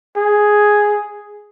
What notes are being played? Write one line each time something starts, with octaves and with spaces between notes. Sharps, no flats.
G#4